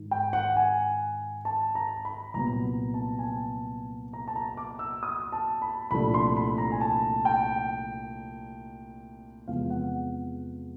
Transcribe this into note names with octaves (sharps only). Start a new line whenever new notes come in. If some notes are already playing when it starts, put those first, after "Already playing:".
Already playing: G#2 D#3
G5
F#5
G#5
A5
A#5
B5
C2 A#2 F#3 B3 A#5
A5
G#5
A5
A#5
A5
A#5
D6
E6
D#6
A5
B5
C2 A#2 F3 A3 D4 B5
C6
B5
A#5
G#5
A5
G5
E2 C3 F3 G#3 B3 F5
F#5